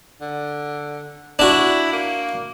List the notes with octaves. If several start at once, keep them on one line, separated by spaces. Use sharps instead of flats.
D3
D4 E4 F#4
A#3